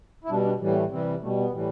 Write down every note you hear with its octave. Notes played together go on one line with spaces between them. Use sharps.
E4
B2 G3 D4
D4
A2 E3 G3
B3
A3
C3 E3 G3 C4
B2 G3 A3
B3
A2 E3 G3